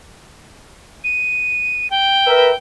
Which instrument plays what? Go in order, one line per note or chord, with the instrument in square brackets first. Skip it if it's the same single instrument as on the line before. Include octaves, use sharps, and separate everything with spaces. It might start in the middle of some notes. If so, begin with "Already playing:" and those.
[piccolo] D#7
G5
[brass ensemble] A#4 B4 E5